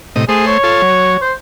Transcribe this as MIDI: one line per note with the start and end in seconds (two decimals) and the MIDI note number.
0.16 0.25 45
0.16 0.25 48
0.16 0.25 75
0.29 0.58 57
0.29 0.43 68
0.29 0.58 72
0.46 1.17 73
0.63 0.82 65
0.63 0.82 69
0.82 1.17 54
1.22 1.33 72